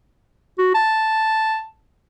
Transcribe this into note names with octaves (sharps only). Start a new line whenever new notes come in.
F#4
A5